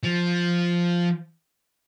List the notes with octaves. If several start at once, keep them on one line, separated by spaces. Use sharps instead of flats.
F3